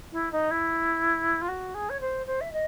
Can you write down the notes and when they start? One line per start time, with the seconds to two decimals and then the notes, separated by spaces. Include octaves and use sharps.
0.12 E4
0.32 D#4
0.51 E4
1.41 F4
1.48 F#4
1.74 G#4
1.89 C#5
2.00 C5
2.26 C5
2.41 E5
2.52 D#5